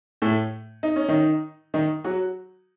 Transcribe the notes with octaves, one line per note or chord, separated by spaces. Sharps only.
A2 A3
D#4
C#4
D#3 D#4
D#3 D#4
F#3 F#4